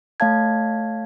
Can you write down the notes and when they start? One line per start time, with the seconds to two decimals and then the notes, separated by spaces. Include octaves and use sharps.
0.20 A3 C#5 F5 A5 G#6